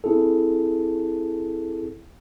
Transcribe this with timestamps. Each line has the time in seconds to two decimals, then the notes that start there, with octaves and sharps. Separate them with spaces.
0.04 C4 E4 G#4 A4